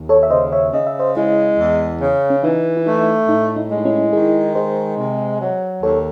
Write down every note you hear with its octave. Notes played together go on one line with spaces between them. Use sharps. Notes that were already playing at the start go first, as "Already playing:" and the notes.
Already playing: D#2
A4 C#5
E5
C#3 C5 D#5
C#5 E5
C#3 D#5
E5
C5 D#5
G#3 E4 G#4
E2
C#3
C#4
E3 D#4
E4
A3 D#4
A2 D#4
D#4
G#3
D#4
C#4 E4
D#3 E4 G#4
G#3 G#4 C5
C3
F#3
D#2 A4 C#5